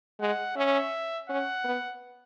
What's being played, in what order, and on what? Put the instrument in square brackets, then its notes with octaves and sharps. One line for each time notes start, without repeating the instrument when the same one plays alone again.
[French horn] G#3 [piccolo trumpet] F#5
[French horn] C#4 [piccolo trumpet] E5
[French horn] C#4 [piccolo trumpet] F#5
[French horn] B3